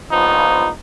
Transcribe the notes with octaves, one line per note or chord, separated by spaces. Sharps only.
A#1 F3 B3 D#4